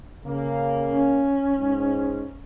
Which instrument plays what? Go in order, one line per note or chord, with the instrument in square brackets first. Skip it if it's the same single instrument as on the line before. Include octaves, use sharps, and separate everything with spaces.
[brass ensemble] C#3 A#3
[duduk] C#4
[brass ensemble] G#2